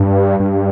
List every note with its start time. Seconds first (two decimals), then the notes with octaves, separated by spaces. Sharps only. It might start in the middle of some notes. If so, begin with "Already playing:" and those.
Already playing: G2
0.40 G2